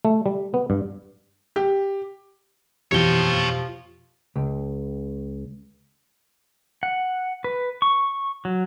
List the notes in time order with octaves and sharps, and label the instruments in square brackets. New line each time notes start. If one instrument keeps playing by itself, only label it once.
[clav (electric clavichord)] A3
G3
B3
G2
[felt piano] G4
[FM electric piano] F2 B2 E3 [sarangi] F3 [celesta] G4 G7 [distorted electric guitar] C#5 G5
[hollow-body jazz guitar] C#2
[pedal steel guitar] F#5
B4
C#6
F#3